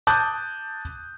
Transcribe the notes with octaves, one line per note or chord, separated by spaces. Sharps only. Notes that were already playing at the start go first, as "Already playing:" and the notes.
A5 D6 D#6 F#6 G6